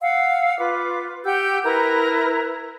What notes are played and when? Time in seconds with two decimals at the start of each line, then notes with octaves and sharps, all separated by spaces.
0.01 F5 F#5 E6
0.59 F4 B4 D6
1.24 G4 F#5 E6 G6
1.64 E4 A#4 B4 A#5